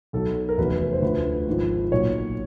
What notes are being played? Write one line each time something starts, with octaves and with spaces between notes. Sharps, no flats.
B1 B2 F#3 A4
A#4
F1 E2 B2 F#3 B4
C5
D2 D3 F3 B4
G#1 G#2 F3
B1 A#2 F#3 C#5